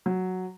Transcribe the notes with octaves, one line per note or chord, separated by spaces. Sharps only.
F#3